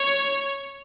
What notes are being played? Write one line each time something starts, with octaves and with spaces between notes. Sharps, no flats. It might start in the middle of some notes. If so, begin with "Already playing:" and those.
Already playing: C#5